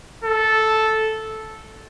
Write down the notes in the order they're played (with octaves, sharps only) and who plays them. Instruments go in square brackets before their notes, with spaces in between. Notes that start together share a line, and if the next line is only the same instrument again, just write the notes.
[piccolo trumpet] A4